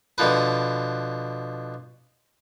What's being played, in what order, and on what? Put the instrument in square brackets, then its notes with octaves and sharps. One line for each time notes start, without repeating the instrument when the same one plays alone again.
[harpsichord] B2 D3 F3 B4